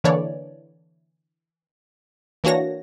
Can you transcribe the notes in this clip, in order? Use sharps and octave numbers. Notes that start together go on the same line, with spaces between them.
D3 E3 A#3 D4 C#5 D5
E3 A#3 D4 F#4 C#5 A#6